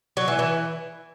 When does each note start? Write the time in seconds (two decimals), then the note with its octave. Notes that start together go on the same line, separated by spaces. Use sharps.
0.17 F#3
0.28 E3
0.39 E3